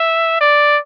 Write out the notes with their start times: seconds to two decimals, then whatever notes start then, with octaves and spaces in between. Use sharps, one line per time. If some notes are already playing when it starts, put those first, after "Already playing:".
Already playing: E5
0.41 D5